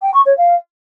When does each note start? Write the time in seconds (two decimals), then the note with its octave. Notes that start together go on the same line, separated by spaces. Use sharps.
0.02 G5
0.14 C#6
0.25 C#5
0.37 F5